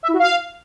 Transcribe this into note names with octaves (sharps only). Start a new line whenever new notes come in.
E5
E4
F#4
F5